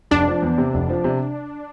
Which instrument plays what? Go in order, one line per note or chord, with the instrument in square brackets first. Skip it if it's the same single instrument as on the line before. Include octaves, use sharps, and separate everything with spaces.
[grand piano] F1 [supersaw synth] D4
[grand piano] F3
E2
C3
F1
F3
C3